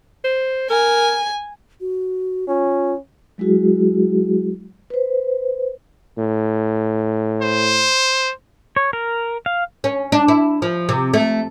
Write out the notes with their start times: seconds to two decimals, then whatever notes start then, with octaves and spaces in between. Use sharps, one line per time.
0.24 C5
0.70 A#4 G#5
1.81 F#4
2.48 C#4 F4
3.38 F#3 G#3 E4 F#4 G#4
4.90 B4 C5
6.18 A2
7.42 C5
8.76 C#5
8.93 A#4
9.46 F5
9.84 C#4
10.12 D4
10.28 E4
10.62 F3
10.89 C3
11.14 A3